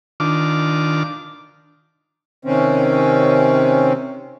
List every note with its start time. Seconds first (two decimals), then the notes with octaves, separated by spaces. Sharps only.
0.20 D#3 D4 F4 D6
2.45 C3 D#3 C4 C#4